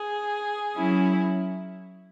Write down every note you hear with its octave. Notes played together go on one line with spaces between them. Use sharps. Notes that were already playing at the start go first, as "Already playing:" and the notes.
Already playing: G#4
F#3 C#4 E4